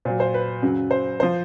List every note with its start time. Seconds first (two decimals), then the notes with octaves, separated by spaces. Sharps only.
0.05 A#2 F#3 C5
0.20 C5
0.34 B4
0.62 F#2 C#3 F#3
0.91 C5
1.20 F3 C5